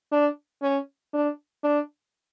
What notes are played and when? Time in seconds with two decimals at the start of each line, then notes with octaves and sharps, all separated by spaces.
0.12 D4
0.62 C#4
1.13 D4
1.64 D4